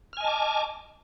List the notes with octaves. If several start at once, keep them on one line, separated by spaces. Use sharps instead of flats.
D#5 G#5 A5 D6 F6